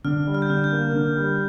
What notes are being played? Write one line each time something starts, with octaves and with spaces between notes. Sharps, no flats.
D3 F6
G3
F6
G6
D3 F6
G6
A#3
D3
G3